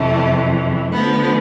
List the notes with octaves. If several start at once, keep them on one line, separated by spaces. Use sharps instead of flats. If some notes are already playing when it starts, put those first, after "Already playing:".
Already playing: F2 C3 E3 A3
D2 D3 F3 B3